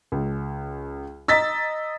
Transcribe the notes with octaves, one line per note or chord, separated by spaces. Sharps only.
C#2
D#5 A#5 E6 A6 B6